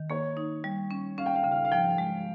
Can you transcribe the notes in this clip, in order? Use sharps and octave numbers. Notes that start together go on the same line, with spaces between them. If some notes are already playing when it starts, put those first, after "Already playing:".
Already playing: D#3
A#3 C#5
D#4
G3
C#4
C#4 F5
G5
F5
C#3 G5
F5
F5
F3 G5
G#3